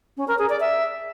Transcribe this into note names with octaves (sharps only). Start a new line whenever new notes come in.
C#4
A#4
G#4
D5
E5